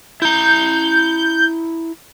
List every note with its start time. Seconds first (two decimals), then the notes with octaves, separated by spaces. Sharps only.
0.22 E4 A#5 G6